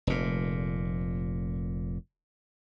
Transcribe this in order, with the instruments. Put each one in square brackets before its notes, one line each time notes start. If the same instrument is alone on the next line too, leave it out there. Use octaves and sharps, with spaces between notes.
[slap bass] F1 A#2